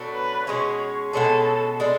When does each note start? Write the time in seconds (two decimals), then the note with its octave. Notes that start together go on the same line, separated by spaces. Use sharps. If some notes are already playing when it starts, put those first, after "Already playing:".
Already playing: B2 F#3 A3 D4
0.14 B4
0.47 B2 G#3 C#4 G#4 C#5
1.13 B2 G#3 C#4 G#4 A4
1.80 G#3 D4 A4